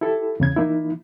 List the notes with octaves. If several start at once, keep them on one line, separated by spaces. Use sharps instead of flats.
E4 G4 A4
E2 C#3 G#6
E3 A#3 D#4 E4